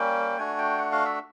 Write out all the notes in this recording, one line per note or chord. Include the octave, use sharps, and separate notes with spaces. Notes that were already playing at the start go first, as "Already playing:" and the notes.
Already playing: G3 A#3 C#4 G5
A3 D4 F#4 G#5
G5
F#5
F5
E5